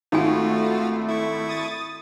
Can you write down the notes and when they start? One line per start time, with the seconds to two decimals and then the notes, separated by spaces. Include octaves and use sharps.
0.12 G#1 A3 D#4 F4 F#4 G#5
1.08 E4 C#6
1.48 D#6 A6